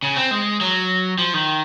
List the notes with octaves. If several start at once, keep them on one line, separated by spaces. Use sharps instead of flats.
C#3
C4
G#3
F#3
F3
D#3